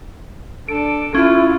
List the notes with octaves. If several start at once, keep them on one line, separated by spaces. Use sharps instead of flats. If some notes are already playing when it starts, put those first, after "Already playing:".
D4 A4 D7
C#4 E4 F4